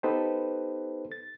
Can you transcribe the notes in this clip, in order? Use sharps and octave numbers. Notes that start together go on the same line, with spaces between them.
B3 D#4 G4 A4 B4 C5
A6